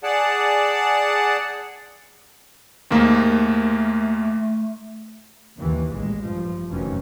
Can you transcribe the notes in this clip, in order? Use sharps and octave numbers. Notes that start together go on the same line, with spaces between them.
G#4 D5 F#5 A5
D#2 G#2 A3 A#3
D#2 D#3 E3
A1 A#2 G#3
G2 F3
F1 F#2 D#3 E3 C#4